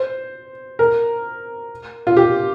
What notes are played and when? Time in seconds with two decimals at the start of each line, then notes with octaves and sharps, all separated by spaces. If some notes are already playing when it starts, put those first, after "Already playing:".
Already playing: C5
0.79 A#4
2.07 F4
2.17 G4